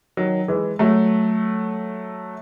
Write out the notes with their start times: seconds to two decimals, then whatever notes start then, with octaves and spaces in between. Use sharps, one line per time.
0.17 D#3 F#3
0.48 E3 G#3
0.79 F#3 A3